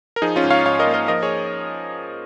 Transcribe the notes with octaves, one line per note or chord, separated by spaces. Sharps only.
A#4
F3 D#4 G#4
C#4 F4
G#2
C#5 F5
G#2 C#5 F5
A#4 D#5
A#3
A#4 D#5
F3 A#4 D#5
G#4 C#5